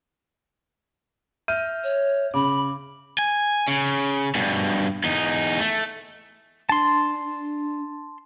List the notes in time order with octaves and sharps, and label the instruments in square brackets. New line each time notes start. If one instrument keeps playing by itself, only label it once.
[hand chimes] E5 F6 G6 [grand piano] D#7
[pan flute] C#5
[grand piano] C#3 [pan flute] B5 [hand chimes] D6
[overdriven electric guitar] G#5
C#3
G2 B2
E2 D#4
A3
[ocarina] D4 [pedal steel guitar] A5 C6